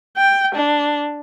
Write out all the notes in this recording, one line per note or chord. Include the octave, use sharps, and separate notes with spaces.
G5
D4